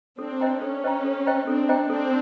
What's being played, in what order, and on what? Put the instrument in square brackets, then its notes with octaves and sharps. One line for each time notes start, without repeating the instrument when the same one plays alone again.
[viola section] C4 D4 [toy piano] A4
[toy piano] C5 D#5 G5 A#5
[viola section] C#4 [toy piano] A4
[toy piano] C5 D#5 G5 A#5
A4
C5 D#5 G5 A#5
[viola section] C4 D4 [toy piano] A4
[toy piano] C5 D#5 G5 A#5
[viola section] C4 D4 [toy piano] A4